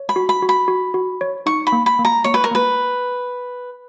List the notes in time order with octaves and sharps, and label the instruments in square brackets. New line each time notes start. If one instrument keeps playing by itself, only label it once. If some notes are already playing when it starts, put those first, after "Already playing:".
Already playing: [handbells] C#5
[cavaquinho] B5
[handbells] F#4
[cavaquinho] B5
[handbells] F#4
[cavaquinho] B5
[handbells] F#4
F#4
C#5
[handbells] D#4 [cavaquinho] C#6
[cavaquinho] B5
[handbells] A#3
[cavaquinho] B5
[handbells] A#3
[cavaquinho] A#5
[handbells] A#3 [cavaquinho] C#5
[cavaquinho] B4
A#4
[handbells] A#3 [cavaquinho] B4